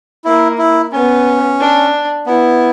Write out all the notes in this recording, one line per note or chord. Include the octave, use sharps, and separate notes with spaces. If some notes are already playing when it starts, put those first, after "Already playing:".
A#3 E4
E4
B3 C#4
D4
B3 E4